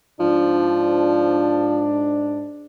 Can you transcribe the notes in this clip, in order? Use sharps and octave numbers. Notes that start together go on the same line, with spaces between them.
G#2 F3 D4